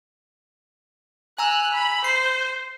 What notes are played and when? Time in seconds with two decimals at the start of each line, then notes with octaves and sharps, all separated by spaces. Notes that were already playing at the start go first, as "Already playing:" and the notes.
1.38 G#5 A#5 E6 F#6
1.74 B5
2.04 C5 C7